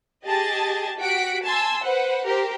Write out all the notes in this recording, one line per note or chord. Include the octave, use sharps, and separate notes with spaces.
G4 G#4 D#5 A5 A6
F#4 G4 F#5 B6 D7
G#5 A5 C6 E6
B4 C5 F#5
G4 A#4 C5